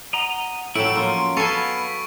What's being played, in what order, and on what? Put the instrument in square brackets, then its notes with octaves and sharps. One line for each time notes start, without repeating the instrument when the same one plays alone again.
[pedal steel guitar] D#5 A#5 [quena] F#5
[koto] A2 F#3 [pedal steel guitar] E4 A4 [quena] G5 [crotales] D7
[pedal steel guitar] F3 C#4 [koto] A#3 [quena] C6
[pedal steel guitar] B3 F5 [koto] A4 G#5 [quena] B5 [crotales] C#6